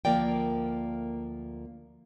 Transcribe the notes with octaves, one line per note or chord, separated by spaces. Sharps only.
D2 F3 A#3 A#4 D5 G5